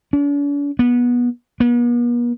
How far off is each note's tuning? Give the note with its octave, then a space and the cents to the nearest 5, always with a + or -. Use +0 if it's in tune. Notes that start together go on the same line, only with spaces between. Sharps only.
D4 -45
B3 -20
B3 -45